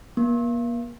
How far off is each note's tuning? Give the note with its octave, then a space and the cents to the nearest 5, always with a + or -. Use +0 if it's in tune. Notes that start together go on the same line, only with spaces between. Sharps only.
A#3 +40